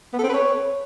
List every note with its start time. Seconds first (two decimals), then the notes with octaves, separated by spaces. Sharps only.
0.13 B3
0.19 A4
0.24 C4
0.29 B4
0.34 C#5